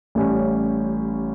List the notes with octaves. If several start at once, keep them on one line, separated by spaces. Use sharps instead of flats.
A1 A2 G3 C#4